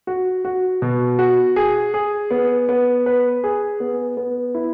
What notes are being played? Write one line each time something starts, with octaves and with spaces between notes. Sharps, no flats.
F#4
F#4
B2
F#4
G#4
G#4
B3
B3
B4
G#4
B3
B3
E4